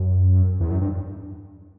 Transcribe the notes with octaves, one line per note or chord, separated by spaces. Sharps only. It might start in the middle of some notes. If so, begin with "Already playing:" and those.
Already playing: F#2
E2
F#2
G2